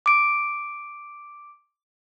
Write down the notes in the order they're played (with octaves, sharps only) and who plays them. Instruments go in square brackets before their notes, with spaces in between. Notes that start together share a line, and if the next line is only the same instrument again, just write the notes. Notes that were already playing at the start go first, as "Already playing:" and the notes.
[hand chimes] D6 D7